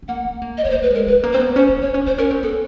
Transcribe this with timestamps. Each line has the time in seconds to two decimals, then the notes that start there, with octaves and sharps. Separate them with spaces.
0.02 B3
0.08 A#3 F#5
0.25 C4
0.42 A#3
0.58 D#5
0.64 A#3 C#5
0.70 C5
0.74 A3
0.82 B4
0.91 G#3 A#4
1.07 G#3 B4
1.24 A#3
1.32 C4 C5
1.40 B3
1.56 C#4 C5
1.69 C4
1.81 C4 C#5
1.94 C#4
2.06 C4 C5
2.18 C#4 A#4
2.31 C4
2.43 B3 A4